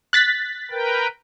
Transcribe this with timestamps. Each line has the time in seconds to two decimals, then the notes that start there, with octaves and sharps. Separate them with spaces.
0.13 F#6 A6 B6
0.71 A#4 B4 G5